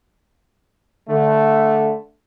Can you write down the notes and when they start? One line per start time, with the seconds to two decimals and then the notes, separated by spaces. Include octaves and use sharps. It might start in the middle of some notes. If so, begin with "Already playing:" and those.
1.08 D3 A3